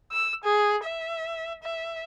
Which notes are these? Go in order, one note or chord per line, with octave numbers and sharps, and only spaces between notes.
E6
G#4
E5
E5